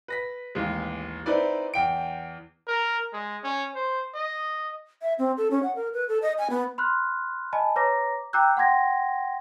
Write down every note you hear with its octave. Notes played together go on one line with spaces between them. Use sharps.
B4 A#6 B6
A1 D#2 E3 G#3
C4 D#4 E4 B4 D5
E2 G5 D7
A#4
G#3
C#4
C5
D#5
E5
C4
A4
C#4
F#5
A#4
B4
A4
D#5
G#5
B3
B5 C6 F6 F#6
D#5 G#5 A5 B5
B4 C#5 A#5 D6 A#6
G5 A#5 D6 E6 F#6 G6
F#5 G5 C6 G#6 A#6